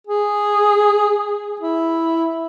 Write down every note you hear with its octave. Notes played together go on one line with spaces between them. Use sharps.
G#4
E4